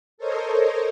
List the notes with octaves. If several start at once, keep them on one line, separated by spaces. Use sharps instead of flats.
A4 A#4 C5 C#5 D#5